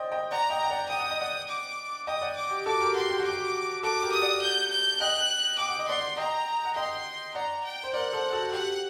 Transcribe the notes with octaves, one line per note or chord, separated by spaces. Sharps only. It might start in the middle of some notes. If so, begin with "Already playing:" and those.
Already playing: C5 D5 D#5 G5
D#5 G5
D5 F#5 A#5
D#5 G5
G5
D5 F#5
G5 D#6
F#5
D#5
D5 F#5
D6
D#5 G5 D#6
D5 F#5
D6
G4
F#4 A4 D6
G4 A#4
F#4 C6
G4
F#4
G4 D6
F#4 A4 D6
G4 A#4
D#6
D5 F#5
G6
G6
D#5 G5 F#6
G5 D6
F#5
D#5
D5 F#5 C6
D#5 G5 A#5
F#5
D#5 G5 C6
D5 F#5 A#5
G5
C5
A#4 D5 F#5
A4 C5
F#4 A4
G4 F#5